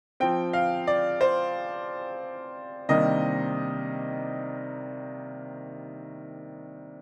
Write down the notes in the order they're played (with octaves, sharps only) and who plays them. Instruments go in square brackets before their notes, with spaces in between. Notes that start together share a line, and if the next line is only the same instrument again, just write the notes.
[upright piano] F3 C4 G5
F5
D5
C5
C3 D#3 G3 A#3 D4 D#5